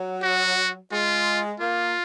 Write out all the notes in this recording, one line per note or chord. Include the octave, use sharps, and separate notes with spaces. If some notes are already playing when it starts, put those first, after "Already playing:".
Already playing: F#3
F#4
G#3 F4
A#3 F4